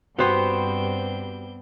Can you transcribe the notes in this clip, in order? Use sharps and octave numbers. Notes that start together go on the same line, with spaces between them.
G2 B3 C4 F#4 G4 C5 G6